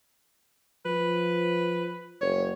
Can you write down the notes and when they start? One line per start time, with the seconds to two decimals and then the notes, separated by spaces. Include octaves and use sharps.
0.85 F3 B4
2.21 F#1 C#5